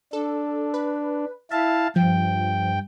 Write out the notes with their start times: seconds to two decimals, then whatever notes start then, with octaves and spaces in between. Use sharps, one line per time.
0.13 D4 A4
0.74 B4
1.51 E4 E5 F5 A5
1.96 G2 F3 G5